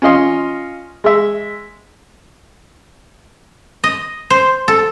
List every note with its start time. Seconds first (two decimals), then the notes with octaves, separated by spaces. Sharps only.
0.02 C#4 F4 D#5 C6
1.04 G#3 E5
3.84 D#5
4.30 C5
4.68 A4